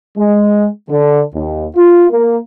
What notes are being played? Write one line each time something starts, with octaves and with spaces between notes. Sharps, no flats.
G#3
D3
D#2
F4
A#3